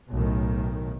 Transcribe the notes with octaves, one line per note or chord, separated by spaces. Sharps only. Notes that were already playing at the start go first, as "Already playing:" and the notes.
B1 A2 D#3